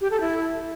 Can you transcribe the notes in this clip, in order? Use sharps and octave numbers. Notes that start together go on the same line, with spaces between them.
G4
A4
E4